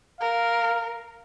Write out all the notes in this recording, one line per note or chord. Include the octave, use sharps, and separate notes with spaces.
A#4 F5